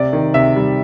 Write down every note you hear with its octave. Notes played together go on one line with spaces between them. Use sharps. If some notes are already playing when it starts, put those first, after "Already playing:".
Already playing: C3 D5
D#3
C3 E5
G3